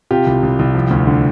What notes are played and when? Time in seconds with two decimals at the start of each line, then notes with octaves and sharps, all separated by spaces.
0.11 C3 F4 G4
0.26 C2
0.43 C2
0.59 C2
0.74 F3
0.90 D2
1.07 D3